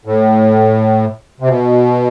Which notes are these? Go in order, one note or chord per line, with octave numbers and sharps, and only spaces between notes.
A2
C3
B2